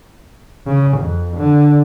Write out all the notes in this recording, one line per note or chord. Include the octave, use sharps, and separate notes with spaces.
C#3
F2
D3